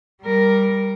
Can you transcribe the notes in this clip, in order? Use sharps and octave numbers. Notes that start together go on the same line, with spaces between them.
G3 A#4